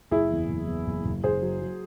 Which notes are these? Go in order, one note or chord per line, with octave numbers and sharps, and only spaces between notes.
F#1 E4 G#4
E2
F#1
E2
F#1
F#1
F#1 G#4 C5
F#3
F#3